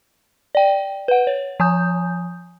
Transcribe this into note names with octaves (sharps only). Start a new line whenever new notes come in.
D5 G5
B4 F#5
C#5
F3 G#5 D#6 G6